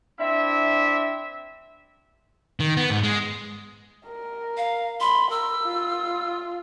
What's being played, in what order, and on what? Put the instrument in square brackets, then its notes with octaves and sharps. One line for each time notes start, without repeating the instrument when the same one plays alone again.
[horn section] C4 D4 E4 E5
[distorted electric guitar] D#3
B3
G#2
G#3
[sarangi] A#4
[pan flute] F5
[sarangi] B5 [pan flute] C6
[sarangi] A#4 [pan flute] E6
[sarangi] F4